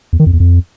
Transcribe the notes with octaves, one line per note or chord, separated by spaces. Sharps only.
E2
D#3
F2
E2
F2